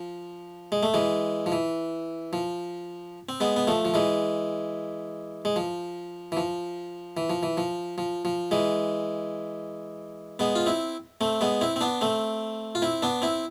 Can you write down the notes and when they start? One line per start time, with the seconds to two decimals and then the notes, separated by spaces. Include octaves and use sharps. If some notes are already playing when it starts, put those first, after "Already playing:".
Already playing: F3
0.72 G#3
0.83 A3
0.94 E3 G#3
1.46 F3
1.52 E3
2.33 F3
3.29 C4
3.40 G#3 B3
3.56 B3
3.67 F3 A3
3.85 F3
3.94 E3 G#3
5.45 G#3
5.56 F3
6.32 E3
6.37 F3
7.17 E3
7.30 F3
7.43 E3
7.58 F3
7.98 F3
8.25 F3
8.51 E3 G#3
10.39 G#3 B3
10.56 F4
10.66 C4 E4
11.21 A3 C4
11.41 G#3 B3
11.61 C4 E4
11.76 C4
11.81 B3 D4
12.01 A3 C4
12.75 F4
12.82 C4 E4
13.02 B3 D4
13.22 C4 E4